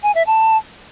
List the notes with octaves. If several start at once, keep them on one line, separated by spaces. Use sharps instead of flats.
G#5
E5
A5